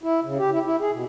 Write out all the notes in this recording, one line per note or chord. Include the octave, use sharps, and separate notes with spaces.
E4
C#3
G4
E4
E4
G#4
B2